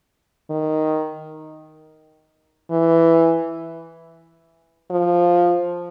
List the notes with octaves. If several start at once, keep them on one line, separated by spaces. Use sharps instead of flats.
D#3
E3
F3